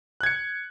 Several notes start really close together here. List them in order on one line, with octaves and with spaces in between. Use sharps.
F#6 G#6 C#7